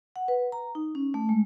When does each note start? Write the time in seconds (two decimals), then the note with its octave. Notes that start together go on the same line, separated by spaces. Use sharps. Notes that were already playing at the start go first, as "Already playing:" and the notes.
0.16 F#5
0.28 B4
0.52 A#5
0.75 D#4
0.95 C#4
1.14 A3
1.29 G#3